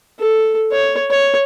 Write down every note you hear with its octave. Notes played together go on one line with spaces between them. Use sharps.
A4
C#5
C#5